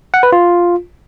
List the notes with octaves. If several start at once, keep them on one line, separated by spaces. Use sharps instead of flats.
F#5
B4
F4